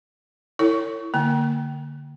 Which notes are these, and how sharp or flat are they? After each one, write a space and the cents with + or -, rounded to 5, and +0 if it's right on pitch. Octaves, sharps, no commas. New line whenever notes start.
E4 +0 A4 +45 C#5 +0
D3 -15 A#3 -20 G#5 -30